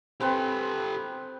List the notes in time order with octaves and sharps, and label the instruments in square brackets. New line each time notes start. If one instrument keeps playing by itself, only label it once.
[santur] C4 B4 G5 [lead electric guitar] G4 A4